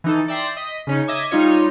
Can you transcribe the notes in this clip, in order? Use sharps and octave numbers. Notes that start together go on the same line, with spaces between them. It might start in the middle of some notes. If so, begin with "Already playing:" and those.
E3 D#4 A4
D5 E5 G5 C6 A#6
D#5 B6
C#3 C#4 D#4
D#5 E5 D6 G#6
G3 D#4 F4 C#5